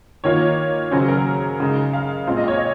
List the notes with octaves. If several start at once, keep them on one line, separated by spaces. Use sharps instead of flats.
D#3 A#3 F4 C#5
C#3 F#3 C#4 C5
A#4
C#3 G#3 D#4
F5
A#2 G#3 C4 F4 F5
D#5
C#5
D#5